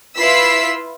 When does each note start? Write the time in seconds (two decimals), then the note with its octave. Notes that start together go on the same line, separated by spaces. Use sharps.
0.17 E4 F4 B4 E6 B6 C7